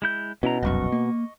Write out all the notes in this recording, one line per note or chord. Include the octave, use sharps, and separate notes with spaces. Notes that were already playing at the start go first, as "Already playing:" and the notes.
G#3 E4 G6
B2 C#4 E4 A#5
F1 C2 F#2 D#5 C#6
A#3